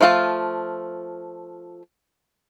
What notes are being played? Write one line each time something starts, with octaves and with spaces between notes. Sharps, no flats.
F3 A3 F4 G#4 A5